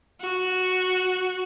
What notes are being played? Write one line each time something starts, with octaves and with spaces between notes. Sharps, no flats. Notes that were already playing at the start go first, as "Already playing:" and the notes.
F#4